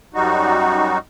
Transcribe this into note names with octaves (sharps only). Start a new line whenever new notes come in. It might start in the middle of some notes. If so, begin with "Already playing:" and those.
F#2 G3 D#4 F#4